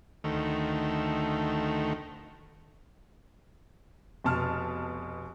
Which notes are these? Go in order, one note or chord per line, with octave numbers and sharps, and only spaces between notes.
D2 D#3 A3
F1 B2 A5 F6